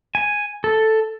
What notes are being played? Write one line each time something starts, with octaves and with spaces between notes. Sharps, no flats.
G#5
A4